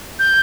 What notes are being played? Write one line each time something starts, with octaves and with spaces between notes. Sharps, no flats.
G6